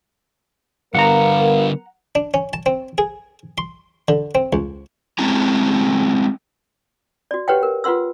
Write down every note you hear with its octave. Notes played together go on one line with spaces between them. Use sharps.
D3 G3 B3 A#4 F5 F#5 A#5
D4
C#4
A5
C4
G#4
C6
D3
C4
C#2
G#3 C4 C#4 E4 A5 A#5
F#4 D5
G4 B4 C#5 F#5 G5
A#4
F4 B4 F#5 C6 E6